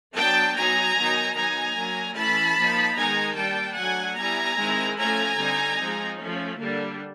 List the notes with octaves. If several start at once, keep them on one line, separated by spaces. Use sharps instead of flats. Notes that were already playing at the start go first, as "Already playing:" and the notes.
F#3 B3 D4 G5 A5
F#3 B3 D#4 G#5 A#5
D#3 F#3 B3 D#4
F#3 B3 D#4 G#5 A#5
F#3 A#3 D4
E3 A3 C#4 A5 B5
F3 A#3 D#4
D#3 G#3 B3 D#4 G#5 A#5
G3 A#3 D4 G5 A5
F#3 A3 D4 F#5 G#5
G3 B3 E4 G#5 A#5
D#3 G#3 C4 E4
F3 A3 C#4 G#5 A#5
D3 G3 C4 D#4
F3 G#3 C4 D#4
F3 A3 C#4
D3 G3 A#3 D4